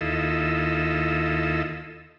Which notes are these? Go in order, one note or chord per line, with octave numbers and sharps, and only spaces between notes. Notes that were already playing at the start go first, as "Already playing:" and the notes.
D#2 E4 F4 A4 D#5 E6